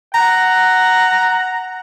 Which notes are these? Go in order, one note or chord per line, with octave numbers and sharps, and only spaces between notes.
F#5 A#5